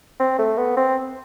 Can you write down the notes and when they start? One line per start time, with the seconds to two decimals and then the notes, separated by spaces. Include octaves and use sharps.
0.20 C4
0.39 A3
0.57 B3
0.77 C4